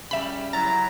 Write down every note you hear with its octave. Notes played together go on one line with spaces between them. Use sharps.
C#3 G3 E5 B5
F#3 E4 A#5 A6